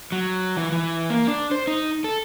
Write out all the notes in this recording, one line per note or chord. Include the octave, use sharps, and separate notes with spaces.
F#3
E3
E3
A#3
D4
C5
D#4
A4